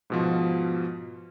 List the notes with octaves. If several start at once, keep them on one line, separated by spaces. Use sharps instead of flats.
G#2 B2 F3